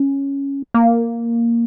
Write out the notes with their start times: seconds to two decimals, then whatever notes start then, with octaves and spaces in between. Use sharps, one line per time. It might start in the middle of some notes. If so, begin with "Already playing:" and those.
Already playing: C#4
0.74 A#3